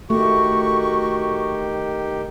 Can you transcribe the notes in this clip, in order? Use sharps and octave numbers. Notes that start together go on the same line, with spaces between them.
D#3 A3 F#4 G4 C#6